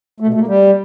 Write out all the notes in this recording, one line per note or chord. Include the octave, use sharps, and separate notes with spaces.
A3
B2
A3
A#3
G3